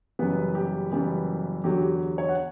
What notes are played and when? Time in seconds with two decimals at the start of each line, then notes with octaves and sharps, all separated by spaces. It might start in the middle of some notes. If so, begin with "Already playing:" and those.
0.19 F#1 F#2 E3 G3 B3 B4
0.55 G4
0.92 F#1 F#2 E3 G3 B3 G4
1.64 E2 D3 F#3 G4
1.82 G4
2.18 C#5
2.29 F#5